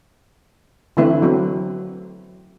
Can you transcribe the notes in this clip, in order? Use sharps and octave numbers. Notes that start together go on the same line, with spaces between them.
D3 E3 A3 C4 E4 B4
F#3 C4